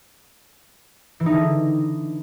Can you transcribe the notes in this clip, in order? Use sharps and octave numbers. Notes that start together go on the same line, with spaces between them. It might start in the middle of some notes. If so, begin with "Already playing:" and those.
E3
D#4
D3